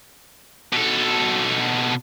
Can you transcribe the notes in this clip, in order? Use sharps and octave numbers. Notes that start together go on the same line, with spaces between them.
B2 A4